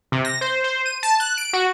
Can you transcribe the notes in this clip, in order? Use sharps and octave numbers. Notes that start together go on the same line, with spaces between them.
C3
A#6
C5
C5
D#7
A5
F#6
D7
F#4